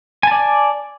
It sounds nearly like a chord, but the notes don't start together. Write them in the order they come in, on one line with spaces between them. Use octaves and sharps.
G#5 A5 D5